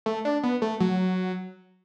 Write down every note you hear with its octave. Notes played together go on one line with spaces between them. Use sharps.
A3
D4
B3
A3
F#3